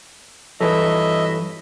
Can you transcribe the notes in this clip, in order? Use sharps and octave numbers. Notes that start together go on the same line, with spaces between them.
G2 E3 F#3 A4 B4 D#5 E5